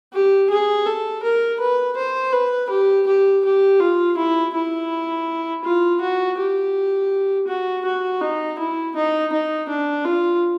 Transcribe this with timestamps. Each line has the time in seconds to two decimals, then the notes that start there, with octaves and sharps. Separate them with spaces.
0.13 G4
0.50 G#4
0.86 A4
1.23 A#4
1.60 B4
1.97 C5
2.33 B4
2.70 G4
3.06 G4
3.44 G4
3.80 F4
4.17 E4
4.54 E4
5.64 F4
6.01 F#4
6.38 G4
7.48 F#4
7.85 F#4
8.21 D#4
8.58 E4
8.96 D#4
9.33 D#4
9.68 D4
10.05 F4